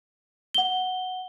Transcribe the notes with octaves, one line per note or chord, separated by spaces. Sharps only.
F#5 G7